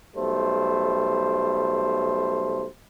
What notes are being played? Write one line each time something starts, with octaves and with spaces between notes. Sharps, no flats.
B1 G3 A3 C5